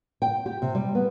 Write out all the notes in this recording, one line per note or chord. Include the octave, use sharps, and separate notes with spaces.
G5
G4
C3
G3
B3